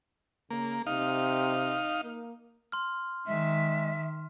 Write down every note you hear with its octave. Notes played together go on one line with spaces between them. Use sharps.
C#3 A#3
C3 D#4 F5
A#3
C6 F6
D#3 G#3 E5